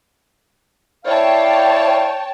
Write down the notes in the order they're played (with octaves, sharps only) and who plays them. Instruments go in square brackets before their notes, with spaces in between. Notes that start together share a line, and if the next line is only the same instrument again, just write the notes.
[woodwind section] E4 D5 F5 [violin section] C#5 G5 A5